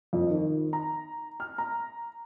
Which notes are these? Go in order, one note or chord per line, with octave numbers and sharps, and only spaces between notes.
F2
D#3
A#5
F6
A#5